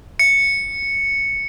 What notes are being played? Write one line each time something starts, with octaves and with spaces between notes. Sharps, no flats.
C#7